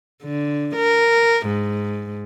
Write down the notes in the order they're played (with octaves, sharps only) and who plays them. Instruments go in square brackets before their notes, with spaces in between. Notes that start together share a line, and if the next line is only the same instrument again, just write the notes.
[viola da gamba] D3
A#4
G#2